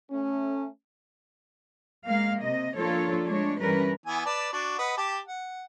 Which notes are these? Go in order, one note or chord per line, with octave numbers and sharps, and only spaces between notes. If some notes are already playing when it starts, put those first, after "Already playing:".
A3 C#4
G#3 A#3 F5
C3 D#5
F3 A#3 D4 F4 A4 C#5
G#3 A3 D4 C#5
G2 E3 G3 C#4 A#4 B4
E3 B3 G#5
B4 D5 A5
D4 F#4
B4 D#5 F#5
G4 G5 A5
F#5